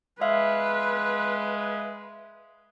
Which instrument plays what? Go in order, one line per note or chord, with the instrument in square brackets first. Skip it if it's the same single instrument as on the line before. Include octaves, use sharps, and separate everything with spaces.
[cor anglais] G#3 [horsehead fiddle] B4 [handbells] E5 F5